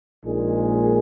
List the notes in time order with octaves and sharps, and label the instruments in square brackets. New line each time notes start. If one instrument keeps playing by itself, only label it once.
[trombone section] A#1 A#2 G#3 D#4 G#4